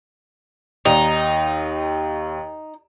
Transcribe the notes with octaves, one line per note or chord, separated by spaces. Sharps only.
D#2 D#4